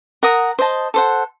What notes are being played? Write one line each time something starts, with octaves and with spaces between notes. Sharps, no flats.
A#4 F#5 A#5 D#6
C5 D#5 A5
A4 C5 F#5